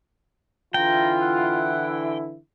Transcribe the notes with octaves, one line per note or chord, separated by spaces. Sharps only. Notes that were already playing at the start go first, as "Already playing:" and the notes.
D3 E3 E4 F4 G5 A#5
F#5